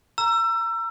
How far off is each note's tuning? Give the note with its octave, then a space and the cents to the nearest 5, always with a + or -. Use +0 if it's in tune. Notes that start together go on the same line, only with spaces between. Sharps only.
A#5 +0 E6 +30